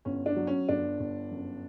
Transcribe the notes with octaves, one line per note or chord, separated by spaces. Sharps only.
G1 C#4
D4
F#3
C#4
G1 D4
G1
F#2